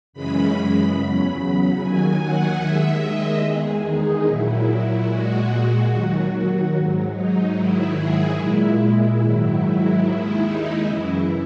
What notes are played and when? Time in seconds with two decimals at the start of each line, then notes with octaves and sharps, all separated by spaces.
0.13 F#2 C#3 E3 G#3 B5
0.96 E2 C#3 F#3
1.78 D#2 D#3 F#3 G#5
2.20 F#5
2.60 D#2 D#3 G#3 E5
3.02 D#5
3.42 E2 D#3 G#3 G#4
3.84 D#4
4.25 A#2 F#3 E4
5.08 A#2 G#3 F#4
5.89 D#2 D#3 F#3
6.72 G#2 F#3
7.13 D#4
7.55 G#2 D#3 F#3 E4
7.96 G#4
8.37 A#2 G#3 E4
9.19 G#2 D#3 F#3
10.02 D#2 D#3 G#3 E4
10.42 D#4
10.84 F#2 C#3 E3 E4